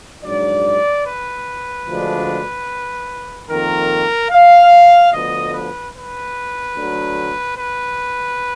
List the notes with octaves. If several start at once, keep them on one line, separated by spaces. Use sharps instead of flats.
A#1 G#2 F#3 D4 D5
B4
D2 D3 F3 G#3 D4
F2 D#3 A#3 A#4
F5
D2 D3 F3 B3 D#5
B4
B4
D2 D3 F#3
B4